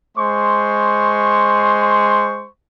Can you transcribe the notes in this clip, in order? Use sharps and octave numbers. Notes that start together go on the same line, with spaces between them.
G#3 C5 C6 C#6